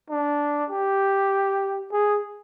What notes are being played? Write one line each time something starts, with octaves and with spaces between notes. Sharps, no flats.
D4
G4
G#4